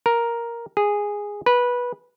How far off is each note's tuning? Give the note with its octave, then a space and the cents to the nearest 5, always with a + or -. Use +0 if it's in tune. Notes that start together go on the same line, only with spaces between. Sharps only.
A#4 +5
G#4 -10
B4 -15